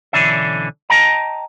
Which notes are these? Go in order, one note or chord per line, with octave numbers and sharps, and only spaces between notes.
B1 D3 E3 C#4 D4 E5
D#5 G5 A5 A#5